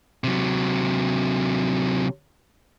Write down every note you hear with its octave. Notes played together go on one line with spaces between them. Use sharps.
C3 F#3